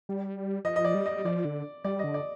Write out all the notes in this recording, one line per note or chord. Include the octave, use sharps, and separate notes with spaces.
G3
F3 D#5
D#5
D5
G3
D#5
F3 D5
D3
G3 D5
D3 D#5
D5